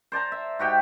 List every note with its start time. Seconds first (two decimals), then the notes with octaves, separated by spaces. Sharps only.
0.12 C5 D5 A5 A#5
0.32 E5
0.59 G#2 F#4 G4 G5